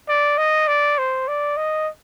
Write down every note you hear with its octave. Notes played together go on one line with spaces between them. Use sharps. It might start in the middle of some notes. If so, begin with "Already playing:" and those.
D5
D#5
D5
C5
D5
D#5